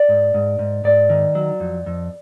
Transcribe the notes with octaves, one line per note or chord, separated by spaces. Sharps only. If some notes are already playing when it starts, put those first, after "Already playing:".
Already playing: D5
G#2
G#2
G#2
G#2 D5
D#3
F#3
F2
F2